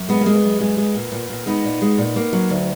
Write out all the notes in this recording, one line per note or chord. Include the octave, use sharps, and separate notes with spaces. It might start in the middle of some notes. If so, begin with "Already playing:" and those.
Already playing: F#2
G#3 B3
A#3
G#3
B3
F#2
G#3
G#3
A#2
A#2
A#2
G#3 B3 D#4
A#2
G#3
A#2
A#3
F#3
D2